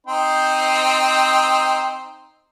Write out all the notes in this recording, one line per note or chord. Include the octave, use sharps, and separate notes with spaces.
C4 D#4 C5